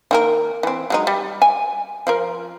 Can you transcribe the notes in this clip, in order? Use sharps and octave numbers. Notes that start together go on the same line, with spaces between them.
D#3 A#3 A#4
E3 C4
F#3 G#3 D#4
G3
G#5
F3 F4 A#4